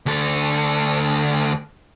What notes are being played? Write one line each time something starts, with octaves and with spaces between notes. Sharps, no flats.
D2 A4